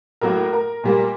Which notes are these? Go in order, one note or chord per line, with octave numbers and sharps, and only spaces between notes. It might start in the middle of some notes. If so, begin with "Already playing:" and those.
A2 F#3 A#3 A#4
A#4
A#2 G3 A#3